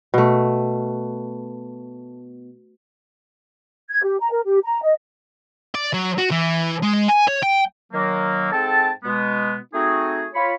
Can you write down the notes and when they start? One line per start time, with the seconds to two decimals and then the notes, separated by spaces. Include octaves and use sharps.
0.14 B2 A3
3.90 G#6
4.03 G4
4.19 A#5
4.31 A#4
4.46 G4
4.64 A#5
4.82 D#5
5.75 D5
5.94 F#3
6.18 F#4
6.31 E3
6.82 G#3
7.08 G#5
7.28 C#5
7.43 G5
7.93 D#3 F#3 A#3
8.52 G#2 C4 A4 G5 A5
9.04 B2 G#3 B3
9.74 A3 C4 D#4 F#4 G#4
10.34 F4 C#5 B5